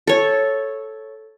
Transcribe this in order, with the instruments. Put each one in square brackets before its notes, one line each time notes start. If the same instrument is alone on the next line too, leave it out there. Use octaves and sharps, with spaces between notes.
[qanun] A4 C#5